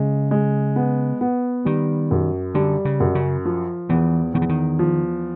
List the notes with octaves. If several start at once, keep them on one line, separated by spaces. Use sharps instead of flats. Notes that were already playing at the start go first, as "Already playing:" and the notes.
Already playing: C#3 G#3
G#3
B3
B3
D#3 G3
F#2
D3 G3
C#3
F#2
C#3
F3
E2 E3
E2 D#3
E3
D#3
F3